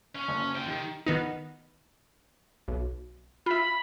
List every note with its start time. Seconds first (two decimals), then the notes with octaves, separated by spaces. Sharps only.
0.16 C#4
0.28 F#1
0.55 F4 G5
0.67 D#3 G4
1.07 D#3 B3 D#4
2.68 B1
3.46 F4 E5 B5